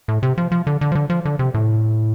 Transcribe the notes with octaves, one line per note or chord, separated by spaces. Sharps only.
A2
C3
F3
F3
D3
D3
F3
D3
F3
D3
C3
A2